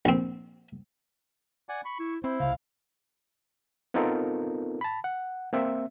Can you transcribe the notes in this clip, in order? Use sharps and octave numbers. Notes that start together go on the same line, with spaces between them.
A#1 C4
D5 F#5 G#5
B5 C#6
E4
C4 E4 C5
C2 C#3 F5
B3 C4 D#4 F4 A4 A#4
A5 B5
F#5
A#3 C4 E5